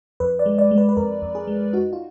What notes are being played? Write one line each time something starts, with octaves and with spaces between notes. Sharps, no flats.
F2 B4
D5
G#3
D5
G#3
B4
B4
F2 A#4
F2
G#4
G#3
D#4 F#4
F4